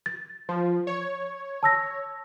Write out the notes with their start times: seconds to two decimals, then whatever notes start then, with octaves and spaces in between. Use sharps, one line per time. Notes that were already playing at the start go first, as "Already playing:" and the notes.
0.06 A6
0.49 F3
0.87 C#5
1.63 A5 E6 A#6